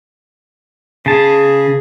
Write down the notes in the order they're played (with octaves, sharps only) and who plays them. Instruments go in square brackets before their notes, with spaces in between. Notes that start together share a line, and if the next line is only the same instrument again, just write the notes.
[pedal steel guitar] C#3 A5 [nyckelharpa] G#4